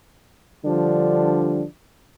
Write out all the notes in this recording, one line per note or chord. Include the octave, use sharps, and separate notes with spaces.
D3 F3 G3 D4